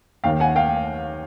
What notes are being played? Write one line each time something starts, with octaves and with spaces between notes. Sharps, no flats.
D#2 D#3 F5 G5
F#5 G#5
F5 G5